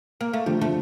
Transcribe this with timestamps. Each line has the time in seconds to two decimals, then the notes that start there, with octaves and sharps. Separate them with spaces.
0.21 A#3
0.33 A3
0.46 D3 F3 G3
0.61 D3 F3 A3